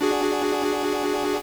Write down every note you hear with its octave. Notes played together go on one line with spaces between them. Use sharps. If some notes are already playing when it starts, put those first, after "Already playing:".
D4 F#4 G#4